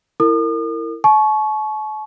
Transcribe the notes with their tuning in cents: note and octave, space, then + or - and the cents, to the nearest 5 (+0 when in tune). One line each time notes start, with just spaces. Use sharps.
E4 +0 A#4 -30 D#6 -45
A5 -45 C#6 +0